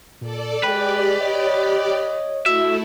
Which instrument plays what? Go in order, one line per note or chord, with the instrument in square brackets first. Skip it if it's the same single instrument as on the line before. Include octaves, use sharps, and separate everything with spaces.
[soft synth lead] A#2 [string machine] A4 D5
[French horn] G#3 [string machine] G4 D5 [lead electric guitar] B4 [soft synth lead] G5
[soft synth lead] C#5 [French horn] D#5
[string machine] A3 E4 [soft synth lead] F#4 [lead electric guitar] E5